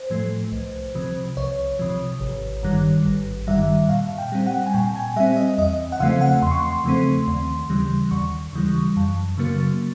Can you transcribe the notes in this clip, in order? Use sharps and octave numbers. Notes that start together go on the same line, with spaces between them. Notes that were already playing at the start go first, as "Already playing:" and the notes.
Already playing: C5
A2 F3 A3
C2
C3 F3
C2 C#5
C3 F3
G#1
G2 D#3 G3
G#1
G2 D#3 G3 E5
A#2 F5
G5
G3 C4
F#5
G#5
A#2 G5
G#5
G3 C4 E5
D#5
E2 D#5
F#5
C#3 F3 A3 C4 F5
F#5
E2 C6
C#6
C6
C#3 F3 A3 C4
D#2
C#3 E3 G3
D#2 C#6
C#3 E3 G3
F#2
C#3 F#3 A#3